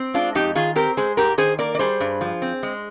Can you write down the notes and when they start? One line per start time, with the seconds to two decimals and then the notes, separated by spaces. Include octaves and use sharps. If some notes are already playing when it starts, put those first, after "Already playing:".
Already playing: C4
0.14 G#3 D4 F4
0.35 F2 D#4 G4
0.55 D#3 F4 G#4
0.76 C4 G4 A#4
0.97 G#3 G#4 C5
1.17 G#2 G4 A#4
1.38 D#3 G#4 C5
1.59 A#3 A#4 D5
1.75 D5
1.79 G3 G#4 C5
2.00 G2
2.21 F3
2.42 C4
2.63 G#3